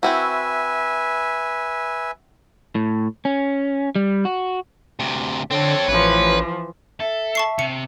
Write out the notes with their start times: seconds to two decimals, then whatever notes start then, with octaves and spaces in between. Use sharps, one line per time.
0.03 C4 E4 F#4 B4 E5 G#5
2.75 A2
3.25 C#4
3.96 G3
4.25 F#4
5.00 D2 C3
5.51 D3 C4 A4 C#5
5.88 A1 E3 F3 B4
7.00 A4 E5
7.35 A5 C#6 C7
7.59 C3 C#7